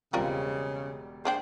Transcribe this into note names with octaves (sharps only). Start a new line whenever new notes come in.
E1 C#3 G3 C4 F4 A#4 D5
A#3 D4 G#4 C5 G5